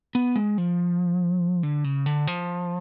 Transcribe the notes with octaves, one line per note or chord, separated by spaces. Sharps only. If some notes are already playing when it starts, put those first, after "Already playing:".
B3
G#3
F3
D3
C#3
D3
F3